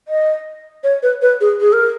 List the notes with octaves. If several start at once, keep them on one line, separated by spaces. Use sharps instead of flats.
D#5
C#5
B4
B4
G#4
G#4
A#4